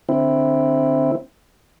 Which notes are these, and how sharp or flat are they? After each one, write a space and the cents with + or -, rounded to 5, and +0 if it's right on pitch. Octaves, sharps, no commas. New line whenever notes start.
D3 +15 C4 +0 E4 +0